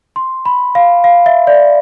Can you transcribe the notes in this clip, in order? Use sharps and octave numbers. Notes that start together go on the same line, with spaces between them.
C6
B5
F5
F5
E5
D5